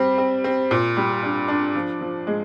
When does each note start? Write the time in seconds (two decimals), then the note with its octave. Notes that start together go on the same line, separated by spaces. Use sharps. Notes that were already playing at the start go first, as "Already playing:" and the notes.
Already playing: G3 C4
0.18 C4
0.44 C4
0.71 A#2
0.97 G3
1.23 D4
1.48 D4
1.75 F3
2.01 F3
2.27 G#3